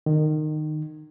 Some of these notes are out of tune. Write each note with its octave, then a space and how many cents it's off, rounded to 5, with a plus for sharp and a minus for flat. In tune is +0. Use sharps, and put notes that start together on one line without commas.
D#3 -20